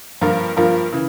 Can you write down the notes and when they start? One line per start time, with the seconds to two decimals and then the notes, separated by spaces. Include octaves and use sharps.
0.21 G2 F3 A#3 F4 A#4
0.56 G2 F3 A#3 F4 A#4
0.92 C#3 E3